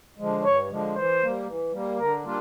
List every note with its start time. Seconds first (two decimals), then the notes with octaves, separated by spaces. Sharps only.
0.18 D3 F3 G#3
0.44 G2 C#5
0.69 D3 F3 G#3
0.96 E3 C5
1.22 G3 A#3
1.47 E3
1.73 G3 A#3
1.99 D3 A#4
2.24 G3 A#3 D4 F4